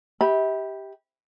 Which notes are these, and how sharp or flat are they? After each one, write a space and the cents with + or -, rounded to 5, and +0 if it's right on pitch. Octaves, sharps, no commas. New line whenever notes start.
G4 +0 E5 -40 B5 -10